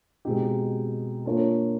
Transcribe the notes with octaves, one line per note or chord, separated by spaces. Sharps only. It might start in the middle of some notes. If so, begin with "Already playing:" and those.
B2 G#3 C4 D#4 G4
A#3 D4 F4 A#4 C#5